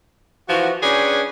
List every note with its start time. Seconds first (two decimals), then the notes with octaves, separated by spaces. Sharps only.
0.49 E3 F3 F#4
0.83 C#4 D4 G#4 B4 G5